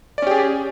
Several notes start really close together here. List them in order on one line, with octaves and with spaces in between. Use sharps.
D5 C#4 G4 G#4